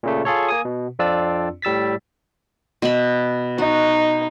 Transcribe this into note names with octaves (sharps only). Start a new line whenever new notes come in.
A#2 C#3 A3
F4 G#4 A4 C#5
A#3 G#5 D#6
B2
F2 C4 D4 F4 D5 E6
A2 G3 E6 A6 B6
B2 E5 B5
D#4 F#4